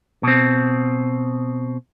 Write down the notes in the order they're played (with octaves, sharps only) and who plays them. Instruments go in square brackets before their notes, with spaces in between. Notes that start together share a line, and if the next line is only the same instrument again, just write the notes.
[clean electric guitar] B2 C4